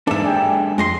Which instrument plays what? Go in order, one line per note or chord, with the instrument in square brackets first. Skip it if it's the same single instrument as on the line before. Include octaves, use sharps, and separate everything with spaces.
[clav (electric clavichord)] G#2 E3 [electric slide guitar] G#3 A#3 A4 [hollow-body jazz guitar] D4 E5
[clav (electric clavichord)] G4 G#4 D5
[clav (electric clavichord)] F2 [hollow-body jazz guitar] G#3 D#5 C6